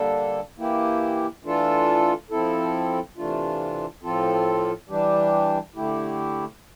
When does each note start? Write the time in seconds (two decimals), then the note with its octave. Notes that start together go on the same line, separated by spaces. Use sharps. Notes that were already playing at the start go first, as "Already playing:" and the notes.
Already playing: D3 G3 A#3 D4 A4
0.58 E3 A#3 E4 G4
1.44 E3 A3 D4 F4 A4
2.31 F3 C4 E4 A4
3.17 C3 E3 A3 D4 F4
4.03 A2 F3 C4 F4 A4
4.89 E3 G3 D4 G4
5.76 D3 A3 E4 G4